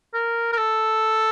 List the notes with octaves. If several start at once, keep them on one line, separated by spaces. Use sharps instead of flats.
A#4
A#4
A4